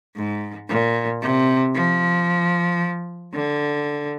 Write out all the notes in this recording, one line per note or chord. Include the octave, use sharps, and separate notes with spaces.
G#2
A#2
C3
F3
D3